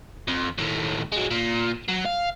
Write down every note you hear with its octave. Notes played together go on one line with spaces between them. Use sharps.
F2
D#2 A2
F#3 G#3
A#2
F#3
F5